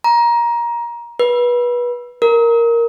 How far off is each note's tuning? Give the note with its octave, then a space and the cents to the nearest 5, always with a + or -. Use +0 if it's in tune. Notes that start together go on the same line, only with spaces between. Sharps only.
A#5 +20
B4 -25
A#4 +0